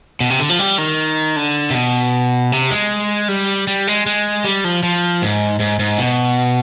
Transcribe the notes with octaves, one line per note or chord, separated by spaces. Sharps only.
B2
C3
D3
F3
G3
D#3
D3
C3
B2
C3
G#3
G3
G3
G#3
G#3
G3
F3
F3
G#2
G#2
G#2
B2